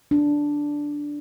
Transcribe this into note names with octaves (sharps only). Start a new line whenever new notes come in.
D4